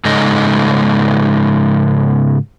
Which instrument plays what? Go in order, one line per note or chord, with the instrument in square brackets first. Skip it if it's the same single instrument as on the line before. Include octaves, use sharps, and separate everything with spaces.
[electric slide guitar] G#2 C#3 G#3 D#4 A4 D#5